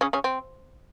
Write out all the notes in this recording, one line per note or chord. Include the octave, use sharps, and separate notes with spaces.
C#3 C#4
C#3 C#4
C4